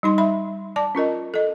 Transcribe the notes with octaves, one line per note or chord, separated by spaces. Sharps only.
G3 D#4 C6
E5 B5
D5 A5 D6
C#4 F4 A#4 D#5
A4 D#5